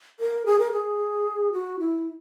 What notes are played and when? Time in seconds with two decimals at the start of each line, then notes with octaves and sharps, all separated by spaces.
0.20 A#4
0.46 G#4
0.59 A#4
0.72 G#4
1.53 F#4
1.80 E4